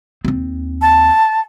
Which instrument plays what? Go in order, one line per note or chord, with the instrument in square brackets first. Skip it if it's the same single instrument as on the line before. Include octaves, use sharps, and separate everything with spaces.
[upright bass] D#2 C4
[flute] A5